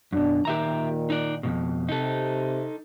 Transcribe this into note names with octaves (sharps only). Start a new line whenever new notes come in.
F#2 B2 D4
A#2 D#3 G4 E5 A#5
D#4 D5
F2 G#2 B2
C3 D#4 A4